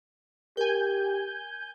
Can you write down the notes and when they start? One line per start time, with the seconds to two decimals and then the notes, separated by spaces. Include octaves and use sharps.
0.57 G4 A#4 G#5 G6